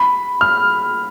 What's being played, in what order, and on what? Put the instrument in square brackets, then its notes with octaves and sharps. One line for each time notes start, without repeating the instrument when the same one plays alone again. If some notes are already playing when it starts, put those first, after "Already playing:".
Already playing: [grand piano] B5
F6